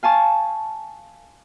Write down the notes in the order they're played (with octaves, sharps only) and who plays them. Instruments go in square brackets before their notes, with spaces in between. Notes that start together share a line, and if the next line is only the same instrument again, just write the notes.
[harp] F5 G#5 A5 C#6